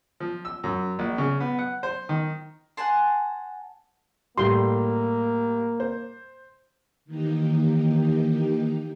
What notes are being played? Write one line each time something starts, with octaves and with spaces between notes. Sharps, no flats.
F3
E6
F#2
A#1
C#3
B3
F#5
C5
D#3
F#5 G#5 A5 C6
A2 G3 A#3 C6
C5
D#3 E3 A#3 D#4 G4